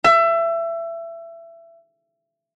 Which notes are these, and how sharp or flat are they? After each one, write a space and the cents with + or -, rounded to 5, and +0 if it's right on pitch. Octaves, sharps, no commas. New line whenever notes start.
E5 +25